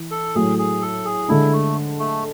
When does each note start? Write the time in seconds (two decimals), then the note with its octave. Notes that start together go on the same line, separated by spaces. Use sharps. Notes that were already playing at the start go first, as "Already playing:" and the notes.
Already playing: E3
0.11 A4
0.35 A2 F#3 A3 G#4
0.59 G#4
0.82 A4
1.05 G#4
1.28 D3 G#3 D4 E4
1.52 A3
1.99 A3